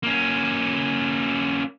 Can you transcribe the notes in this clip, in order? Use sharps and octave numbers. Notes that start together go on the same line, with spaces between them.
A#3 C#4